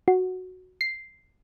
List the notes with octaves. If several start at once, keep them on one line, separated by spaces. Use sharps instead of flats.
F#4
C7